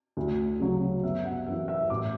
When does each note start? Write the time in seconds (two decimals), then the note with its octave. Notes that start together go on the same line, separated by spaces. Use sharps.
0.17 D2
0.59 C#3 F#3
1.03 G1 E5
1.25 F#5
1.46 F#2 E5
1.50 E3
1.68 E5
1.90 A1 D6